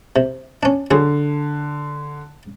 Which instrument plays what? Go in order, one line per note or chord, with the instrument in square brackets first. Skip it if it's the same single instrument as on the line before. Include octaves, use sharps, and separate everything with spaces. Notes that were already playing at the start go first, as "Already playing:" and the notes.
[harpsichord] C3
C#4 D4
[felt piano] D3 [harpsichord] F#3 G#4